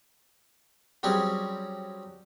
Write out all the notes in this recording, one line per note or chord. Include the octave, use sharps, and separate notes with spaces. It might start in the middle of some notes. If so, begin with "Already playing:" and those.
F#3 G3 C4 C#4 G#4